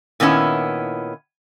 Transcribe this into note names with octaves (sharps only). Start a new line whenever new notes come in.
A#2 D#3 B3 C#4 E4